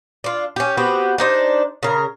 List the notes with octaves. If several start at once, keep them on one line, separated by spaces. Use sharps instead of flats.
D4 F4
C#4 G4
B3 C4 F#4 G4
D4 D#4 C5
C#3 A#4